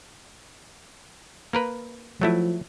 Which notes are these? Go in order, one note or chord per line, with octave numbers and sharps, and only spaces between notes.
A#3 A#4 B4
F3 F#3 A3 E4